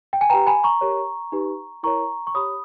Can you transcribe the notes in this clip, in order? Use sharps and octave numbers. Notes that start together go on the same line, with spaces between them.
G5
G#5
G4 B4 G5 A#5
G#5 B5
A#5 C#6
G4 A#4 C#5
D#4 G4 B4
E4 A#4 C#5 A#5 C#6
C#6
G4 C#5 B5 D#6